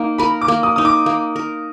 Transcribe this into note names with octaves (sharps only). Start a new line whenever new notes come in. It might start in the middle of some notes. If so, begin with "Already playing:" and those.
Already playing: A#3 D#4
A#4 B5
D6
A#3
D#6
D#4 D#6
D6
A#3
A#4